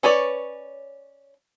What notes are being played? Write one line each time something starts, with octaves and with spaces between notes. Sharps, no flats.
C#4 B4 C#5 D5